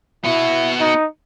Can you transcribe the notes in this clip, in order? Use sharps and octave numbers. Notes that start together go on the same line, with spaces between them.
B3 E4 F#4
D#4